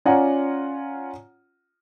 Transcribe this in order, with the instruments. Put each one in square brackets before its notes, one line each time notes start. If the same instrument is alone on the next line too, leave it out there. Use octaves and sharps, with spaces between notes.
[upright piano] C#4 F4 D5 F#5 G#5 A#5